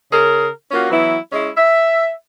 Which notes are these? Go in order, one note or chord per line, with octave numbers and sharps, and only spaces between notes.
C#3 G#4 A#4
A#3 C#4 F4 F#4
E3 F#3 B3 E4
G#3 C#4 E4
E5